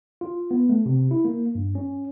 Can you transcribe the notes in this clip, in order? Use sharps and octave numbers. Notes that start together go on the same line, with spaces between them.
F4
B3
A3
C3
E4
A#3
G2
C#4